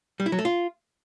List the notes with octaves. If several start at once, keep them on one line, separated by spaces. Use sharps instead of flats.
G3
E4
F#3
A3
F4